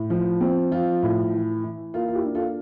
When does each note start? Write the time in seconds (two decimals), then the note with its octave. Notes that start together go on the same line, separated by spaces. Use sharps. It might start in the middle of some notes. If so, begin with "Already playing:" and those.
Already playing: A2
0.10 F3
0.41 C4
0.71 F3 F4
1.03 A2
1.33 E3
1.63 E3
1.94 A#3 F4
2.08 F4
2.15 E4 G4
2.25 D4
2.35 F4 A4